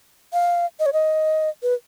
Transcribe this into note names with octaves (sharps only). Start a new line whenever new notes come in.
F5
D#5
C#5
D#5
B4